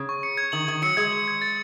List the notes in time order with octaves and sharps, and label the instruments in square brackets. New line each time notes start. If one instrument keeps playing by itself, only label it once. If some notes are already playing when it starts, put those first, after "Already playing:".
Already playing: [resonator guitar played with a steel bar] C#3
[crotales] C#6
C#7
G#6
[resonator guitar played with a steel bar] D#3 [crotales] F#7
[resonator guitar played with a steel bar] D#3 [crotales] G#6
[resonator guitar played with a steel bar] F#3 [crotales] C#7
[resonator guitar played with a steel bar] G#3 [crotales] G#6
[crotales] F#7
G#6
A6